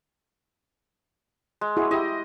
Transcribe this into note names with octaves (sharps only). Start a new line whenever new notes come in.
G#3
E4 F#4 G#4
E4 G4 D#5